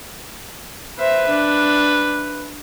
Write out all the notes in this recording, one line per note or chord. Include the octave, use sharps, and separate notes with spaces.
B4 C5 E5
D4